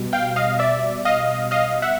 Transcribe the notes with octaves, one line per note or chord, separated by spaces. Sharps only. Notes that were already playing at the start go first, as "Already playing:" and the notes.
Already playing: B2 G3
F5 G5
D#5 F5
D5 E5
D#5 F5
D#5 F5
E5 F#5